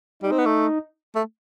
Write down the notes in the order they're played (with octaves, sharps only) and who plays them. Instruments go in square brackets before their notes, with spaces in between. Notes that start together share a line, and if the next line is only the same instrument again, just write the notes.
[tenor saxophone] G3 [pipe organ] D#4
[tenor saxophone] C4
B3
A3
A3